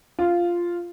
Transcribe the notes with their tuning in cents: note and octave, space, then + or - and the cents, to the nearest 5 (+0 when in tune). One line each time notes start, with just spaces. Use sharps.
F4 -5